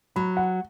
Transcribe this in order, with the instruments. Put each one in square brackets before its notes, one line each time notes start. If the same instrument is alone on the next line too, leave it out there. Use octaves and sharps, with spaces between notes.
[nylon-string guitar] F#3 [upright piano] B5
[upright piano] F#5